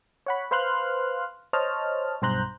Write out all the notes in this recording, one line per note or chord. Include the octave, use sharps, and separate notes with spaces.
C#5 F#5 B5
B4 C5 F5 C6 F6 F#6
C5 C#5 D#5 A5 F6
B1 G2 C5 A#5 F#6 G6